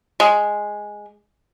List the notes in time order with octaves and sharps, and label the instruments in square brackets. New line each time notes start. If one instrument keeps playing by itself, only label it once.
[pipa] G#3